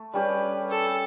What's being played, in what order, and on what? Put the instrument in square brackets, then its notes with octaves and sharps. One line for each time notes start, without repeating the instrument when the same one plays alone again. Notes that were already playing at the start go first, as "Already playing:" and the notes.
Already playing: [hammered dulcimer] A3
[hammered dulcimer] G3 C#4 G4 [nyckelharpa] B4
[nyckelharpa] A4